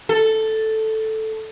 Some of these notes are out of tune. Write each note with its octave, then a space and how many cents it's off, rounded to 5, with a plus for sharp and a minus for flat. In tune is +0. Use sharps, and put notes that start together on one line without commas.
A4 +0